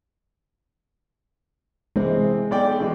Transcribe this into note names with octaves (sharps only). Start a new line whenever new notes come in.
C3 E3 G#3 C4
B1 D5 G5
B2 E3 G#3